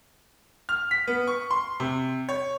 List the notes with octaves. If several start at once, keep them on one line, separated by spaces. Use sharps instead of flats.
F6
B6
B3
C#6
C6
C3
C#5